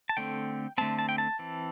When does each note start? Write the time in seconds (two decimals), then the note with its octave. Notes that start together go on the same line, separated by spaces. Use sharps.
0.09 A5
0.17 D3 A3 C4 G5
0.78 D3 A3 C4 A5
0.99 A5
1.09 G5
1.18 A5
1.39 E3 C4